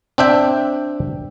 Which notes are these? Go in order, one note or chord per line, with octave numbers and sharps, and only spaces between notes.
C4 D4 E5 G5